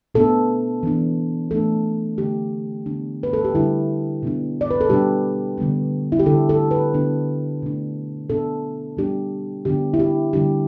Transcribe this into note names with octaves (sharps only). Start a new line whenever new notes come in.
B2 B3 D4 A4
E3 B3 D4
E3 A3 D4 A4
D3 A3 D4 G4
D3 B3 D4
B4
A4
G4
D3 G3 D4 E4
B2 B3 D4
D5
B4
A4
B2 G3 B3 D4 G4
D3 G3 B3
E4
G4
D3 G3 D4 A4
A4
B4
D3 B3 D4
B2 A3 D4
B2 B3 D4 A4
B2 G3 B3 D4 G4
D3 B3 D4 G4
E4
G4
D3 G3 D4 G4